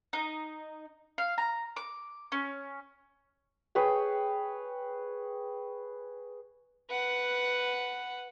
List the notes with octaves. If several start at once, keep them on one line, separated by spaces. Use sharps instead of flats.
D#4
F5
A#5
D6
C#4
G#4 B4 C#5 G5
B4 F#5